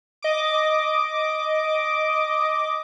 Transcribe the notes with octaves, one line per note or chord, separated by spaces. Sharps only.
D#5 D6